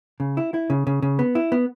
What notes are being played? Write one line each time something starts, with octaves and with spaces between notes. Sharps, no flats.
C#3
E4
E4
C#3
C#3
C#3
B3
E4
B3